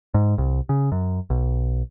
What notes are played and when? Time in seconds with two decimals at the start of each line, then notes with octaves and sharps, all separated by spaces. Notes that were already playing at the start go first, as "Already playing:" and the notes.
0.14 G#2
0.38 C2
0.69 C#3
0.92 F#2
1.30 B1